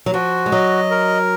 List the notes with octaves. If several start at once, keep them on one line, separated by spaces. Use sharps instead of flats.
F#3
F3 F#4
G#3
F#3 D#5
A#4